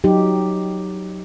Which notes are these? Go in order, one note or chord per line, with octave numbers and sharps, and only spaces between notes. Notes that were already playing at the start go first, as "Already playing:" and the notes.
F#3 D#4 G4